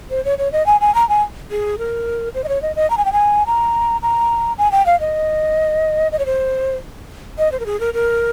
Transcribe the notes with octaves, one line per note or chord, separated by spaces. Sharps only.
C5
C#5
C#5
D#5
G#5
G#5
A#5
G#5
G#4
A#4
C5
D#5
C#5
D#5
D#5
A#5
G#5
G5
G#5
A#5
A#5
G#5
G5
F5
D#5
D#5
C#5
C5
D#5
C5
A#4
G#4
A#4
A#4